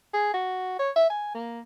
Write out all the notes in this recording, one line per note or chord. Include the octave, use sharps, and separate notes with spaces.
G#4
F#4
C#5
E5
G#5
A#3